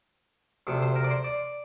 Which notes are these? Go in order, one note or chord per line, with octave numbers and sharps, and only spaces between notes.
D2 C3 F3
C5
A#4
D5
C5
D5